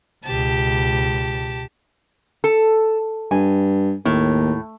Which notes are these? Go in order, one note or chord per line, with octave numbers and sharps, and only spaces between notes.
C#2 B2 G4 A5
A4
G2 G#5
D#2 A2